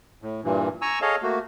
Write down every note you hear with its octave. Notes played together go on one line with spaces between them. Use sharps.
A2
G2 A#2 E3
G#5 A#5 C#6 E6
G#4 A4 C#5 D#5 F5
A3 A#3 F#4